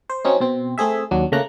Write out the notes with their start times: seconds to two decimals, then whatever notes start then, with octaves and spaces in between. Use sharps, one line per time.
0.10 C5
0.24 F#3 C4 C#4 D#4
0.40 B2 C4
0.78 A3 C4 G#4 E5
1.11 D#2 F#3 D4
1.32 C#3 A3 A#3 A#5 F#6